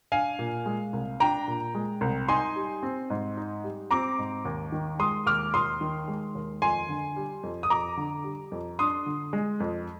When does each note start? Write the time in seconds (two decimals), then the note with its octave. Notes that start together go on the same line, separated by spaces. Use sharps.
0.12 D4 F5 G#5
0.39 A#2
0.66 G#3
0.93 C2
1.20 D4 G5 A#5
1.48 A#2
1.75 G#3
2.01 C2
2.28 D#4 G#5 C6
2.56 G3
2.83 C4
3.10 G#2
3.37 D#4
3.64 G3
3.91 C4 A#5 D6
4.18 G#2
4.45 D#2
4.72 D#3
4.99 G#3 C6 D#6
5.26 D#2 D6 F6
5.54 D#2 C6 D#6
5.81 D#3
6.08 G#3
6.35 D#2
6.62 F2 G#5 C6
6.89 D3
7.16 G3
7.43 F2
7.63 D#6
7.70 F2 A#5 D6
7.97 D3
8.24 G3
8.52 F2
8.79 D4 C6 D#6
9.06 D3
9.33 G#3
9.60 F2